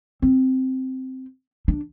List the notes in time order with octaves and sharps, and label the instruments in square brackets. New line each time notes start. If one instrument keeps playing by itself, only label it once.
[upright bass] C4
D4